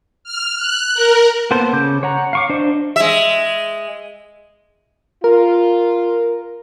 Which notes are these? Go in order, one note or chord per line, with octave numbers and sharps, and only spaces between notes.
F6
F#6
A#4
A#3 B3 A4 C5
C#3 D6 G6
C#5 F#5 A#5
F5 C#6 D6
D4 C5 D#5
G#3 E5
F4 A#4